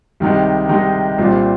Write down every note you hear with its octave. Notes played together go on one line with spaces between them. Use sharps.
C2 C3 D#3 G#3 D#4
C2 C3 D#3 G#3 D#4
C2 A#2 G3 C4